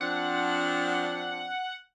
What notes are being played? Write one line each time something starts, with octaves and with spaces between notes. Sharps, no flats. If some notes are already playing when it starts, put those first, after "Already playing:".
F3 C4 D4 F#5